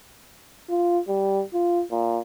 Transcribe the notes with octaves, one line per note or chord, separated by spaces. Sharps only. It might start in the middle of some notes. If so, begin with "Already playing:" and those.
F4
G3
F4
A#2